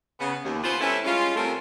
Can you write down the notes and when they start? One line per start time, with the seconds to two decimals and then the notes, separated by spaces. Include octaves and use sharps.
0.19 C#3 B3
0.44 D#2
0.63 B3 C#4 F4 B4 C5
0.81 G3 C#4 E4 A4 B4 C#5
1.05 G3 G#3 C#4 F4
1.35 C3 G3 A3 C#4 F4 A#4